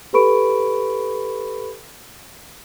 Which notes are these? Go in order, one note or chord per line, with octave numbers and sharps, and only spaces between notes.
G4 A4 B4 B5 C#6 D7